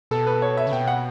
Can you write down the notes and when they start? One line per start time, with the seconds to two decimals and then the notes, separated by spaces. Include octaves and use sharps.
0.11 B2 A4
0.27 B4
0.42 C#5
0.57 E5
0.67 C#3
0.72 B2 G5
0.87 F#5